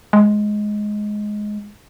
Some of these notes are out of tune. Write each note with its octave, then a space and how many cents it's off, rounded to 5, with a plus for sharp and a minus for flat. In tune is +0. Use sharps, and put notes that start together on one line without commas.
G#3 +10